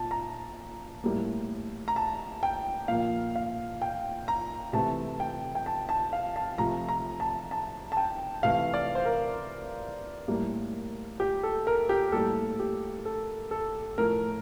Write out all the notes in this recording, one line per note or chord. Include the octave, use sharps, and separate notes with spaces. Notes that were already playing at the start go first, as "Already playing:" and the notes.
Already playing: A#2 A5
A#5
A2 G3 A#3
A#5
A5
G5
A#2 F3 A#3 F5
F5
G5
A#5
C3 E3 A3 A5
G5
G5
A5
A5
F5
A5
C3 F3 A3 A#5
A#5
A5
A5
A5
G5
C3 E3 A3 F5
D5
C5
A#4
A2 G3 A#3
G4
A4
A#4
G4
A2 G3 A#3 A4
G4
A4
A4
A2 F3 A3 A#4